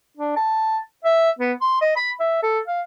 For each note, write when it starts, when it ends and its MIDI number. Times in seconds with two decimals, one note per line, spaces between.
0.17 0.35 62
0.36 0.79 81
1.04 1.30 76
1.39 1.53 59
1.61 1.80 84
1.81 1.91 75
1.96 2.12 83
2.20 2.41 76
2.42 2.60 69
2.68 2.81 77